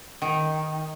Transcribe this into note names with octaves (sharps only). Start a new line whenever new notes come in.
D#3